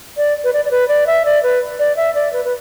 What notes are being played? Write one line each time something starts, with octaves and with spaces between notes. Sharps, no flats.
D5
B4
D5
D5
B4
D5
E5
D5
B4
D5
E5
D5
B4
B4